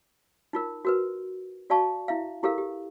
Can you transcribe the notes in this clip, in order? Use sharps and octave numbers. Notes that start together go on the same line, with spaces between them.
D#4 F4 A#4
F#4 A#4 B4
F#4 D5 F5 A5 C#6
E4 E5 F5
E4 G4 A4 A#4 F5
G4